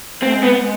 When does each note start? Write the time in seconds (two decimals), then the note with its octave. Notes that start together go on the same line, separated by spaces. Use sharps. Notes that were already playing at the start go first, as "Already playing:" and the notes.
0.22 A3 C4
0.34 G#3
0.43 B3
0.57 G#3